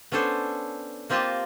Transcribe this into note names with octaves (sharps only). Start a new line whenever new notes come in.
B3 C#4 D4 A4 C5
A#3 C4 F4 G4 D#5 A5